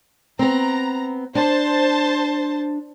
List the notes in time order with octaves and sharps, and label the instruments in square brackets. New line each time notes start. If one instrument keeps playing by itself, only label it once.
[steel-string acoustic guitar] B3 C4 [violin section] A#5
[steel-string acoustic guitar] D4 [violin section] C5 A5